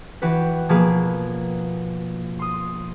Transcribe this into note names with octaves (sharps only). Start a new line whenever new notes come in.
E3 F#4 G4 B4
B2 F3 A#3 G#4 B4
C6 D#6